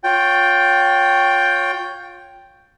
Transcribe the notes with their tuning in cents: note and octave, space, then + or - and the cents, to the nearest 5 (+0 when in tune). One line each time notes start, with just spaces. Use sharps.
F4 +30 C#5 +0 G5 +0